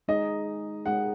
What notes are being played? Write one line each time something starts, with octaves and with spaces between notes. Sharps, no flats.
G#3 D#4 G#4 D#5
G#3 D#4 G#4 F#5